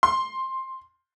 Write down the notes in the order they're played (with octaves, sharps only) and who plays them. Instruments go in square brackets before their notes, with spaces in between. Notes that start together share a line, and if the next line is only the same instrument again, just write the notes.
[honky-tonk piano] C6